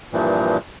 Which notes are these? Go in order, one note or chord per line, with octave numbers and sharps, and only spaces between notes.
G2 A#2 E3 F3